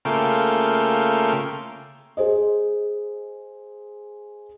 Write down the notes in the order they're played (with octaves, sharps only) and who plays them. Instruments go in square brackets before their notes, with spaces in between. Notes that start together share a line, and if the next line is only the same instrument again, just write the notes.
[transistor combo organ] C#3 A3 A#3 F4 G5
[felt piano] G#4 C5 D#5